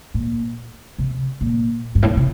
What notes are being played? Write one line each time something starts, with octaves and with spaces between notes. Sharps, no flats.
A#2
C3
A#2
G2
A2
A#2
C3